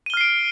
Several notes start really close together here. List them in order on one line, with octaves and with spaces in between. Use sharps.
D#7 G7 F6 C7 D7